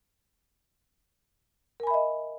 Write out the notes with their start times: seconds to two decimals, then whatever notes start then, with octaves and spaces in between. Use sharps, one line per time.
1.80 A#4
1.83 G#5
1.87 B5
1.91 E5
1.94 D#5